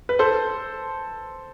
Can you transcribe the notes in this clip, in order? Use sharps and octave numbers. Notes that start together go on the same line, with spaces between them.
B4
A4 C5